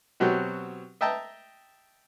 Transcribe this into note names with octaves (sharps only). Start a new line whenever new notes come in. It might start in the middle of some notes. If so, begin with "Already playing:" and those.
B2 F#3 C4 G4
D#5 E5 G5 A5 A#5